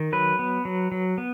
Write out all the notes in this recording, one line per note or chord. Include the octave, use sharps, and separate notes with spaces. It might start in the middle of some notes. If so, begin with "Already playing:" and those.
Already playing: D#3
F#3 B4
B3
F#3
F#3
B3